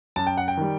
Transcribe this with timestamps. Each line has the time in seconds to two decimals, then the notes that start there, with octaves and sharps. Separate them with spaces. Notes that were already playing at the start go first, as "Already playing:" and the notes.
0.16 F#2 A5
0.27 G5
0.37 F#5
0.48 G5
0.57 D#3 G3